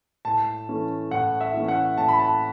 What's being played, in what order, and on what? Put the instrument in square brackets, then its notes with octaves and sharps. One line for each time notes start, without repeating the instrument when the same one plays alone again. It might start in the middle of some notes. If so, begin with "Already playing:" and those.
[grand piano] A2 A5
E3 A3 C#4
A2 F#5
E5
E3 A3 C#4
F#5
A2 A5
B5
A5